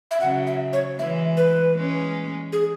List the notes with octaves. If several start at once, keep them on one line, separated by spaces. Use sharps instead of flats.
E5
C#3 F#3 F#5
E5
C#5
E3 G#3 E5
B4
G#3 C#4
G#4